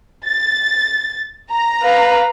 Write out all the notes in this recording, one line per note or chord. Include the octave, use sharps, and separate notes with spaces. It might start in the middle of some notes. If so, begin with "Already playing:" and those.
A6
A#5
B4 F5